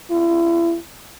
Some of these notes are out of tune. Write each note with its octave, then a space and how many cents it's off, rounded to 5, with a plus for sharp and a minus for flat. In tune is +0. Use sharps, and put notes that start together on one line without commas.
E4 +40